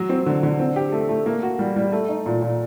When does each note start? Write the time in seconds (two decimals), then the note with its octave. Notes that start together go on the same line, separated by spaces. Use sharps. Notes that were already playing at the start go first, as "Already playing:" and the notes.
Already playing: F#3 F#4
0.09 C4
0.26 D3
0.43 D3
0.59 C4
0.76 G4
0.92 A3
1.09 A3
1.26 A#3
1.43 F#4
1.59 G3
1.76 G3
1.92 A3
2.09 D#4
2.26 A#2
2.42 A#2